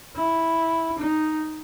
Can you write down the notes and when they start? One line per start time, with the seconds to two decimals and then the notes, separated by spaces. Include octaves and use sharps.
0.16 E4
0.98 D#4